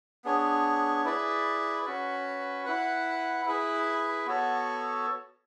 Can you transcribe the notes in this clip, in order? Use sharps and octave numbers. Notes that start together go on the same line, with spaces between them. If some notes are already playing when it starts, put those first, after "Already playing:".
B3 D4 G#4 C#5
E4 G#4 B4 D5
C#4 F#4 B4
E4 B4 F#5
E4 G#4 B4
B3 F#4 A4 C#5